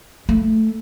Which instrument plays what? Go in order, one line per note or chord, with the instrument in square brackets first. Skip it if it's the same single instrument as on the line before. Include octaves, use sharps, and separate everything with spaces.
[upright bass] A3